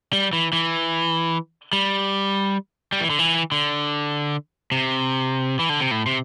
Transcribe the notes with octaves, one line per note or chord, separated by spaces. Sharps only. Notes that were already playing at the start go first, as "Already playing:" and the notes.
G3
E3
E3
G3
G3
E3
D3
E3
D3
C3
E3
D3
C3
A2
C3